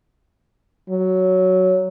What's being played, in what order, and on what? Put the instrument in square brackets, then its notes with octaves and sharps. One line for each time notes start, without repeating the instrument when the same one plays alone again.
[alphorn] F#3